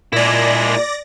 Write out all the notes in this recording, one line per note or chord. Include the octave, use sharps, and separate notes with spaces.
A#2 G#3 E4 D5 A#6